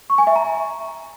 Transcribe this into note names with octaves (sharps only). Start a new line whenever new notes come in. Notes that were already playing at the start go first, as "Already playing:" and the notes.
C#6
G#5
E5
A#5